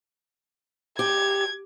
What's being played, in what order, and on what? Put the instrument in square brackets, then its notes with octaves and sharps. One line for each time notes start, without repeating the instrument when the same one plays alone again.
[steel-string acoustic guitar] G4 [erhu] G#6